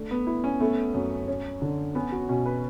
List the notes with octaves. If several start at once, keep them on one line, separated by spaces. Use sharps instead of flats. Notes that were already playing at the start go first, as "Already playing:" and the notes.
Already playing: A3 D4
B3
E4
C#4
A3 B3
F#2
C#4
D3
B3 C#4
F#4
B2 C#4
B4